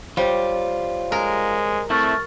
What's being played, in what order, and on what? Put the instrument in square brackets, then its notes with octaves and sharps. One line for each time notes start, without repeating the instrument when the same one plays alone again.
[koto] G3 [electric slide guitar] F4 [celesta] C5 C#5
[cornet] G#3 [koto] A#4
[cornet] A3 [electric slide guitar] C4 E4 [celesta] C#6 F6 A6